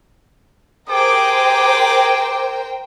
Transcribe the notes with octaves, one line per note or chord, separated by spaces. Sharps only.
G4 G#4 A#4 C5 G5 D6